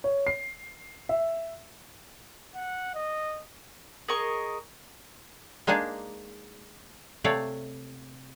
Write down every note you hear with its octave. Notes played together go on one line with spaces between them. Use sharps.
C#5
C7
E5
F#5
D#5
G#4 A#4 D#5 C#6
G#3 A#3 D4 D#4 G#4
C3 A3 C#5 D5 F5